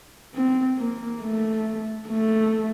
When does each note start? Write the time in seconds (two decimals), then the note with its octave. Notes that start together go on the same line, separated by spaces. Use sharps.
0.35 C4
0.79 A#3
1.21 A3
2.08 A3